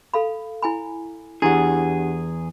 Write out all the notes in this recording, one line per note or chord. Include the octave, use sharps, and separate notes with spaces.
A4 F5 B5
E4 G#5 B5
E2 D4 E4 G4 G#4 F#5